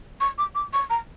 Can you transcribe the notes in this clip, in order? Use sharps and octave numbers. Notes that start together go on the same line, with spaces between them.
C#6
D6
D6
C#6
A#5